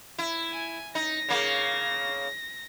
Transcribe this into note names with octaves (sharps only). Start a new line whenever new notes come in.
E4
G#5
D#4 A#6
C#3 A#3